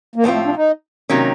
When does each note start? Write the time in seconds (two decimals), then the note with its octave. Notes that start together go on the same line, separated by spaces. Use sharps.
0.16 A#3
0.24 A2 F3 G#3 B3 C4 F4
0.34 A3
0.45 D4
0.56 D#4
1.09 C3 D#3 F#3 A#3 C#4